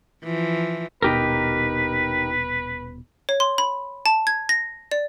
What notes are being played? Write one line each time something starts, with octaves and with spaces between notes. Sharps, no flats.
E3 F3
D#1 B2 D#4 G4 A#4 B4
C#5
C6
B5
A5
G#6
A#6
D5